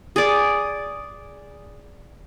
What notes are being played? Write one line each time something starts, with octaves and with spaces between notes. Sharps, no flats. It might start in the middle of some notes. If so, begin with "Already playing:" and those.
G#4 D5